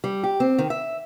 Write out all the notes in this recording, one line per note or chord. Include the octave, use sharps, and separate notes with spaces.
G3
G4
C4
D#3
E5